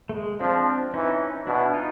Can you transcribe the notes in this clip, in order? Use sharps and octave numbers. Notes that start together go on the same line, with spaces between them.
A3
G#3
F3 C4 D4
E3 C#4 D#4
B2 D4 E4
D#4 F4